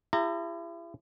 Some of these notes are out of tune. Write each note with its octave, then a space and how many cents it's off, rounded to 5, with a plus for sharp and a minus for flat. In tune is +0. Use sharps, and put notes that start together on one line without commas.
E4 +35 G4 +45 A#5 -20